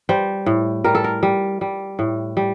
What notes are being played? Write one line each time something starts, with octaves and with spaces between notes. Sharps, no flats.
G3 C5
A2
G3 A#4
A4
A#4
G3
G3
A2
G3